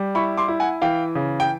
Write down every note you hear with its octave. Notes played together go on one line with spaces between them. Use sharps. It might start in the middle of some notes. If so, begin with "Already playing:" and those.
Already playing: G3
E4 B5 C#6
C6 D6
E4
F#5 G#5
E3 F5 G5
C#3
G5